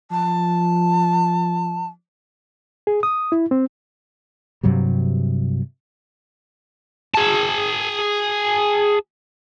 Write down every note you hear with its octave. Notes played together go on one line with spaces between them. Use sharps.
F3 A5
G#4
D#6
E4
C4
G2 C3 F#3 G3
G#4 A5